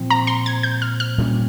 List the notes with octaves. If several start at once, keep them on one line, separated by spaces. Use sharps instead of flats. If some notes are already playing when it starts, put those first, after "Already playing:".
Already playing: A#2 F3 C4
A#5
C6
G#6
G6
F6
F6
A#2 G3 A#3 C#4